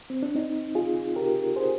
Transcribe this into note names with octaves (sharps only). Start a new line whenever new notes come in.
C4
D4
C4 D#4
F4 G#4
G4 A#4
G#4 C5